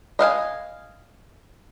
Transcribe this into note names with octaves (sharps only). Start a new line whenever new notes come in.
D#5 F5 F#5 G#5